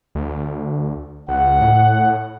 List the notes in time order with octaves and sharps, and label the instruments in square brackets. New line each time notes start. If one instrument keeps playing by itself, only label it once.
[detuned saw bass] D2
[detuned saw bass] C#2 [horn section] F#5
[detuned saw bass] A2